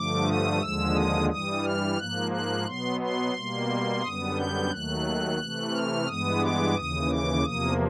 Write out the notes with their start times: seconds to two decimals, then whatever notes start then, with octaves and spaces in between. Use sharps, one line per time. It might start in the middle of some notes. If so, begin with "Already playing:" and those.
Already playing: G2 D3 F3 A3 D6
0.27 D#6
0.61 D#2 D3 F3 G#3 E6
0.95 D#6
1.29 G2 E3 G3 D#6
1.64 F6
1.98 G#2 F3 A#3 F#6
2.31 F#6
2.66 B2 F#3 B3 C6
3.00 C6
3.34 B2 G3 A#3
4.02 F#2 D3 G3 B3 D#6
4.36 G6
4.71 D#2 D#3 F#3 A3 F#6
5.39 C3 E3 A3
5.73 F6
6.07 G2 E3 G#3 B3 D#6
6.41 D6
6.75 D#2 C#3 E3 D#6
7.09 D6
7.44 E2 C3 F3 A#3 D#6